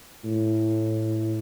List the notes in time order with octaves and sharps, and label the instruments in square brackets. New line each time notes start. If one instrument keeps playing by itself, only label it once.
[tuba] A2